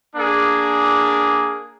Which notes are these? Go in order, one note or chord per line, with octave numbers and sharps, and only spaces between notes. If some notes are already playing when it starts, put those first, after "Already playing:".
A#3 D4 G#4